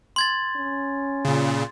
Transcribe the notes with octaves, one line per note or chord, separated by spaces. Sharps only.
C6 G#6 A6
C#4
A#2 C#3